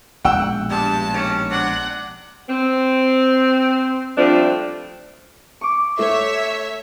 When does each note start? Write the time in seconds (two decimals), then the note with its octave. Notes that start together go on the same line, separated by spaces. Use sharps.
0.25 A#1 B2 G#3 F#5 G5 E6
0.70 G2 A5
1.13 D#2 C#4
1.51 C3 D4 F#5
2.49 C4
4.17 F3 G3 A3 C4 D4
5.61 C#6 D6
5.99 A3 C#5 E5